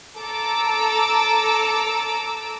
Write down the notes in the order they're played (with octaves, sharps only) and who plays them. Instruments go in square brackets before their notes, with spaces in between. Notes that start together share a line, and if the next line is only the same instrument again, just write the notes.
[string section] A4 A#5 D6 E6